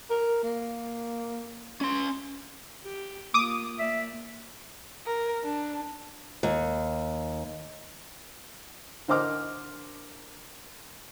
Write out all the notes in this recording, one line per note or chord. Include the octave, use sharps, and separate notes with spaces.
A#4
A#3
C#4 C6
G4
A#3 F4 D6 D#6
A#3 D5 E5
A#4
D4
D#2
D3 A#4 C5 D#5 D6 F6